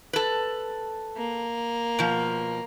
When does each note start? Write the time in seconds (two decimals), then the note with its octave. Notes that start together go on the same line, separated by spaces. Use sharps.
0.13 A4 B4
1.18 A#3
1.99 B2 F3